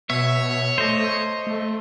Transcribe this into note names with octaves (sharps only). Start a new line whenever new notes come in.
B2 C#5 E5
A3 C5 D#5
A3